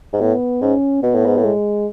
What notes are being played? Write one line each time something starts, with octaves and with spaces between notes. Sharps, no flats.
G#2
A2 B3
G#2 C#4
B2 B3
A2
G#2
A2
G#3